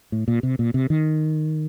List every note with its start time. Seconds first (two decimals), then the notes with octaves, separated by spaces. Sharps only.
0.12 A2
0.28 A#2
0.43 C3
0.59 A#2
0.74 C3
0.90 D#3